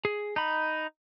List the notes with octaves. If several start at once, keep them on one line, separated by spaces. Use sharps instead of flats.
G#4
D#4 B5